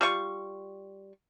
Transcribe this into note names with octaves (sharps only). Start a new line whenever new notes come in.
G3 F4 C#6